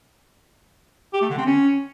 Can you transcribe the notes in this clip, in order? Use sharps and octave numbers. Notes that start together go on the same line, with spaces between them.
G4
A3
D3
C4
C#4